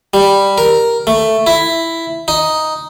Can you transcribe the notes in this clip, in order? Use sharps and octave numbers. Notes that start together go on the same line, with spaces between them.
G3
A#4
A3
E4
D#4